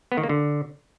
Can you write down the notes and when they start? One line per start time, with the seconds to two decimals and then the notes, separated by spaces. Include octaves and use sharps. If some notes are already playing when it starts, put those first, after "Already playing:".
0.12 B3
0.18 D#3
0.23 A#3
0.29 D3